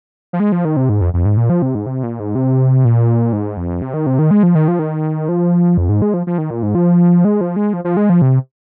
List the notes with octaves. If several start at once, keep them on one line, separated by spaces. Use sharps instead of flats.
F3
G#3
F3
D#3
C3
G#2
F2
F2
G#2
A#2
F3
C3
G#2
C3
A#2
G#2
C3
A#2
G#2
F2
C3
D#3
C3
D#3
G#3
F3
D#3
F3
D#3
F3
F2
G#2
G#3
F3
F3
D#3
A#2
G#2
F3
G#3
F3
G#3
F3
F3
G#3
F3
C3